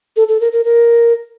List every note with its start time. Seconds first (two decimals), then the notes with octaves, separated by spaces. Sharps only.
0.17 A4
0.28 A4
0.40 A#4
0.52 A#4
0.64 A#4